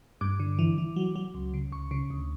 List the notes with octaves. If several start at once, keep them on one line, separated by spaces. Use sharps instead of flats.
G2 D6
D3
E3
E3
F#3
F#3
C#2
C#3
C#2 C#6
C#3
D2